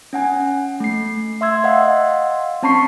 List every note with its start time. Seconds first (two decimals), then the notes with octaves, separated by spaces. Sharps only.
0.13 C#4 F#5 G#5
0.80 A3 C7
1.41 E5 C6 E6 G#6
1.64 D#5 F5 F#5 C6
2.63 C4 C#4 A5 B5 C#6 C7